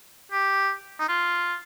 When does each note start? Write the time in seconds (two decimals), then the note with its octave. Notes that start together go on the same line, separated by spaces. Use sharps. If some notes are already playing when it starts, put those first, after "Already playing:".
0.32 G4
1.00 D#4
1.09 F4